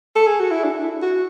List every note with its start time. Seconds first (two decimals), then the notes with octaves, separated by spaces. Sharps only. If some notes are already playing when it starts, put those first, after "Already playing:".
0.16 A4
0.27 G#4
0.40 F#4
0.51 E4
0.64 D4
0.83 E4
1.02 F#4